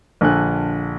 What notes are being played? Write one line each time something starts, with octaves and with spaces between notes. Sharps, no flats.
A#1 D3 A4 G#5 F#6